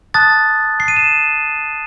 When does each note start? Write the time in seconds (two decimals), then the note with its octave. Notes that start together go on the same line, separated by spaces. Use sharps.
0.14 A5 D#6 F#6 A6
0.80 C7
0.88 D#7
0.97 E7